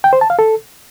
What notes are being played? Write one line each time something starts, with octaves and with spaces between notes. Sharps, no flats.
G5
C5
A5
F5
A4